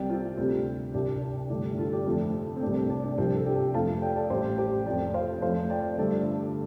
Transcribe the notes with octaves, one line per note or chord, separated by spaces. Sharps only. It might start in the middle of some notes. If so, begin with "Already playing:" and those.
Already playing: C2 C3 G3 D5 G5
C4 F4
D2 C3 G3 C4
C2 C3 G3 D4
D4
G1 G2 D3 A3 D4 G4
F4 A4
D4 G4
F1 F2 F3 A3
C4
C2 C3 A3 D4
C4
D4
D4
C2 C3 F3 C4 F4
A4
D4 G4
F2 F3 A3 F5 A5
D5 G5
A4 D5
A1 A2 G3 G4 C5
G4 C5
F2 F3 A3 D5 G5
C5 F5
F2 F3 A3 C5 F5
D5 G5
G1 G2 D3 A3 A4 D5